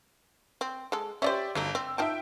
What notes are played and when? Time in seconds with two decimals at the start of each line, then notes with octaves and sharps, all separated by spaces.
0.61 C4
0.92 G#3 A4
1.22 C#4 G4 G#4 C5 D5 E5
1.55 G1 F#3 A3 D#4
1.75 C4 E6
1.98 D#4 F4 E5 G5 A5